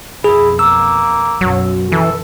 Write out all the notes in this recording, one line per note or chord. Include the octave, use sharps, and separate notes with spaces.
B1 F2 E4 G#4
A#3 E6
B1 F#2 F#3
E3 A4